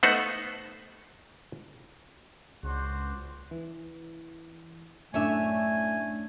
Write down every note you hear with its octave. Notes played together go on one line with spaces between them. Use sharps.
A3 B3 D#4 C5 F#5
C#2 D4 F#4 C5
E3
F#2 A2 A3 D4 C#5 E5 G#5